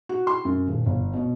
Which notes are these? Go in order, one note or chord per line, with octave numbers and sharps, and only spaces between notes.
F#4
C6
F#2
D#1
G1
B2